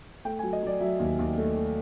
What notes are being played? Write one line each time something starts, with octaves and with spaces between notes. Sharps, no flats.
A3 G5
G#5
F#3
D#5
F#3 D5
F#3 E5
D#2
D#2
A3
A3